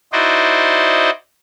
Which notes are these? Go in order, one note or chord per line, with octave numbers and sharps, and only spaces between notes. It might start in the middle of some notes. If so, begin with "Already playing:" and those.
D#4 E4 F#4 C5 D5 D#5